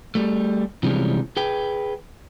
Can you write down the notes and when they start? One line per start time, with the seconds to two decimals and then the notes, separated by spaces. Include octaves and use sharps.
0.15 G3 A3
0.83 C3 E3 F3 G3 G#3 C#4
1.37 G#4 B4 G5